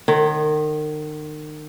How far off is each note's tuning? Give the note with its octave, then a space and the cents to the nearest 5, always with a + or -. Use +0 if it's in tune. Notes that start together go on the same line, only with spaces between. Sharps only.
D#3 -35 C#5 -35